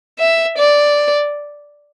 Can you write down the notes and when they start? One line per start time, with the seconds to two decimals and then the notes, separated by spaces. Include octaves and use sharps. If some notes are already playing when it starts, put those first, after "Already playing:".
0.19 E5
0.57 D5